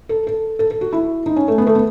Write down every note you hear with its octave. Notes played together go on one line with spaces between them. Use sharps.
A4
A4
A4
A4
F#4
E4
D#4
C#4
A3
B3
A3
B3